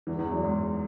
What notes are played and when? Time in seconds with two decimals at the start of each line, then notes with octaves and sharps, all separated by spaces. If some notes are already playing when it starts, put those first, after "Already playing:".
0.07 E2 E3
0.19 E2 E3
0.32 F#2
0.44 G#2